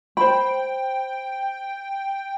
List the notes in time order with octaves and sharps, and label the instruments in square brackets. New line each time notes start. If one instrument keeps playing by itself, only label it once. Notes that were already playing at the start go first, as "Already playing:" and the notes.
[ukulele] C5 B5 [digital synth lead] G5